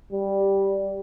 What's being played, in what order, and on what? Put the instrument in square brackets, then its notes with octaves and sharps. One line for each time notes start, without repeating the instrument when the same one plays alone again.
[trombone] G3